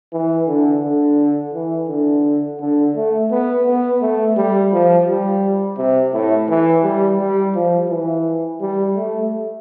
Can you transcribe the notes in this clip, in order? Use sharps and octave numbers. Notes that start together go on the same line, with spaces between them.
E3
D3
D3
E3
D3
D3
A3
B3
B3
A3
G3
F3
G3
C3
A2
E3
G3
G3
F3
E3
G3
A3